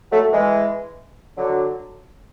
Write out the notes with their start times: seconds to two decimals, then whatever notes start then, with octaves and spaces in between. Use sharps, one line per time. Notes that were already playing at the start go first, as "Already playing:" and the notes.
0.12 F#3 A3
0.33 E3 G#3
1.37 D3 F#3